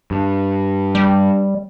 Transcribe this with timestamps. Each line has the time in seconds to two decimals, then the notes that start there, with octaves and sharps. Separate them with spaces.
0.11 G2
0.95 G3